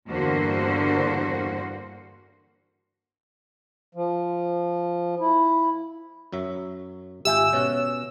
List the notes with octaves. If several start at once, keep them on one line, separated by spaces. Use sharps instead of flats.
E2 G2 D3 A#3 F#4 C5
F3
E4
F#2 F#3 E5
G#1 F4 G4 E5 G5 G#5 E6
B2 C#4 C#5 F#5